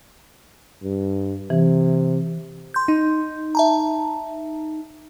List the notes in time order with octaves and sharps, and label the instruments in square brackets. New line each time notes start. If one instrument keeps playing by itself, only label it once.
[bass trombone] G2
[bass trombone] C3 [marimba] E3
[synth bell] C6 G6
[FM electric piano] D#4
[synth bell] E5 A5 A#5